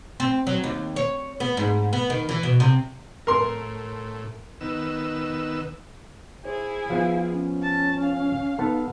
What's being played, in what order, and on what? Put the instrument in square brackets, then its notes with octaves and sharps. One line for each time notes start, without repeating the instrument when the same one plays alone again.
[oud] C4
F#3
D#2
C#5
B3
G#2
B3
D#3
E3
B2
C3
[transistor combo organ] A2 [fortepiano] A#4 C6
[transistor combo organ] D#3 B3 E6
[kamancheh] E4 G#4 [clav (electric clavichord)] C5
[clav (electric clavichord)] F3 B3 [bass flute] F5
[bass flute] C#4
[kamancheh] A5
F5
[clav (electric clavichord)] B3 A4 [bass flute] D#4